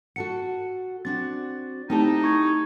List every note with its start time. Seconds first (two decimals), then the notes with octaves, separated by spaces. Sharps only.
0.16 F#4 A4 F#5 C#7
1.05 C4 D4 F#4 A6
1.90 A3 C4 D#4 E4 G4 A5
2.24 C#6 G#6